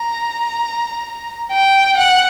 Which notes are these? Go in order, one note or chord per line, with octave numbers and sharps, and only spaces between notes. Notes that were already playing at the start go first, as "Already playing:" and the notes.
Already playing: A#5
G5
F#5